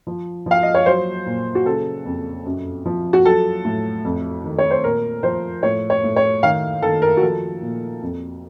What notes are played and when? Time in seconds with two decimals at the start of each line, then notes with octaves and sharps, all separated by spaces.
0.07 F3
0.46 F3 F5
0.63 D#5
0.74 C#5
0.86 F#3 C5
1.26 A#2
1.55 F#4
1.65 C#3 A4
2.05 F2
2.45 F#2
2.86 F3
3.13 F#4
3.24 F#3 A4
3.65 A2
4.05 F2
4.44 D#3
4.58 C#5
4.71 C5
4.83 A#2 A#4
5.23 F3 C5
5.63 A2 C#5
5.90 C#5
6.04 A2
6.16 C#5
6.43 D#3 F5
6.82 D#3 A4
7.02 A#4
7.17 F#4
7.22 F3 A4
7.62 A#2
8.02 F2